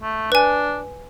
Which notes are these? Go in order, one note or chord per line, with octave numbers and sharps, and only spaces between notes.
A3
D4 B4 G#5